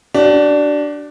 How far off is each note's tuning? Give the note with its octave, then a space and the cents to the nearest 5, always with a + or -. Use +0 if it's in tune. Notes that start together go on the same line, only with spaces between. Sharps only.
D4 +0 F#4 +45